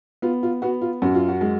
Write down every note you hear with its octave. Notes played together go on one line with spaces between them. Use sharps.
B3 F4
F4
B3 F#4
F4
F#2 F#4
F4
F#4
G#3